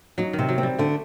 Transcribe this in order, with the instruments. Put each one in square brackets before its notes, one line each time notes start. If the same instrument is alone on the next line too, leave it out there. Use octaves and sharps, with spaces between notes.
[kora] F#3 [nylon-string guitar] D#4
[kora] D#3
[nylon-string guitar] C3
[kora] F#3
[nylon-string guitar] C4
[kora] G3
[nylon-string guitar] D3 [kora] A3